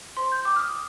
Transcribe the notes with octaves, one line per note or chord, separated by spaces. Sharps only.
C5 C6
G6
G5 D6
F6
D#6